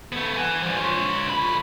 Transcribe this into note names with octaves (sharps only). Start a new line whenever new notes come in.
A3 B3
B4 G#5
F3 G3
F4 C#5
D2 B5